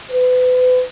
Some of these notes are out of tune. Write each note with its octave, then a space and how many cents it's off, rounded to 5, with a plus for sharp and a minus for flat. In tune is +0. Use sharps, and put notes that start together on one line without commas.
B4 +35